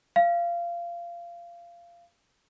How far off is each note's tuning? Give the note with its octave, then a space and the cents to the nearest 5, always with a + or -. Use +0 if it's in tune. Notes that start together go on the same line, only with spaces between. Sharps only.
F5 -20